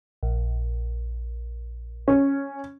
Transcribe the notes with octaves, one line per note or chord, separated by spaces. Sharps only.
A#1
C#4